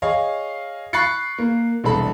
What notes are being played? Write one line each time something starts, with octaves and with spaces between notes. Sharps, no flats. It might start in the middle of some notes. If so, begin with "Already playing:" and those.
G#4 C#5 D#5 F5
B5 C#6 F#6 A6 C7 C#7
A#3
E1 C2 A4 B5